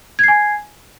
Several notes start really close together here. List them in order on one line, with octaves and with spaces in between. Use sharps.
G#6 C7 G#5